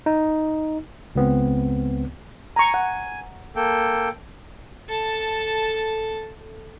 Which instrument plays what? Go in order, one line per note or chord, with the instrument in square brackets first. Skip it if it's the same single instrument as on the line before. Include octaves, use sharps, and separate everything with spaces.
[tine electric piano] D#4
C#2 B3 C4
[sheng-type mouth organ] G#5 [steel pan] A#5 C#6
[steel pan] F#5
[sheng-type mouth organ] A#3 A4 G5
[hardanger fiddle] A4 A5